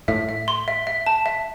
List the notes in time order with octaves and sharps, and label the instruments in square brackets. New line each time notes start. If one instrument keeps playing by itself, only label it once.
[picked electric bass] A2 [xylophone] E5
[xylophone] E5
C6
E5
E5
A5
E5